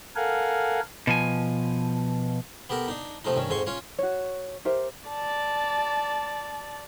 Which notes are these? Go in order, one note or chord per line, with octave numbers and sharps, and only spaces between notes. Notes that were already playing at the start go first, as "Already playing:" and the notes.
A4 A#4 F5 F#5 G#5
B2 F3 G#5
B3 G4 A4 A#4
D4 D#4
C3 F3 A3 D#4
G2 D#3 C#4
F2 G#2 G#5 C6 C#6
C#4 F4 C#5
F#4 C#5
G4 A#4 C5 E5
D5 A5